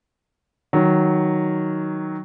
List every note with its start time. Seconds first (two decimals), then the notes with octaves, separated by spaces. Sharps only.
0.73 D#3 F#3